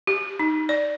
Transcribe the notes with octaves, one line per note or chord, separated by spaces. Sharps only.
G4
D#4
D5